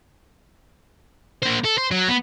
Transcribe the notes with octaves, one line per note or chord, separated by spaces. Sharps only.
A#3 C5
A4
C5
F#3
B3